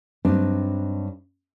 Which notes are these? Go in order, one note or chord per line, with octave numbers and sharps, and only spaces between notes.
G2 F#3 C4 D4 D#4